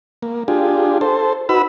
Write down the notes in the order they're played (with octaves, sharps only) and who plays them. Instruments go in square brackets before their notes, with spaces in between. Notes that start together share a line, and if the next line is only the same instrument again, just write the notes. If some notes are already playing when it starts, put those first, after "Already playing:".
[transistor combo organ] A#3
D4 F4 G4 G#4
A4 C5
D#4 F#4 B4 B5 E6